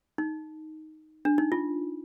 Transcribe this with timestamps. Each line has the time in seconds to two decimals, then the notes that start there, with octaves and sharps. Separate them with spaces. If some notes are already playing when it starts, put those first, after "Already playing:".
0.18 D#4
1.25 D4
1.38 D#4
1.52 F4